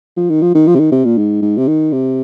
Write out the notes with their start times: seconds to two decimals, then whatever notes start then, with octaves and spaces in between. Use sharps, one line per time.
0.17 F3
0.30 D#3
0.42 F3
0.55 D#3
0.67 F3
0.75 C3
0.79 D#3
0.92 C3
1.05 A#2
1.18 G#2
1.42 G#2
1.57 C3
1.67 D#3
1.92 C3